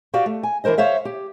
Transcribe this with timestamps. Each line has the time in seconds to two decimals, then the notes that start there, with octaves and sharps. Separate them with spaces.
0.14 F#4 G4 D5 F5
0.26 A3
0.43 G#5
0.64 E3 D4 A#4 C5 D#5
0.78 C5 C#5 E5 F5
1.05 G4